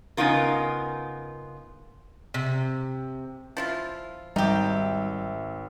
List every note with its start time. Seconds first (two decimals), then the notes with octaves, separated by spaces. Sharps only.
0.17 C#3 B3 D#4 F4 A#4
2.34 C3
3.57 F3 E4 F4
4.36 G#1 G3 D#4 G4 E5